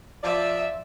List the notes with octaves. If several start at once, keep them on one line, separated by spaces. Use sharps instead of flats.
F3 D5 E5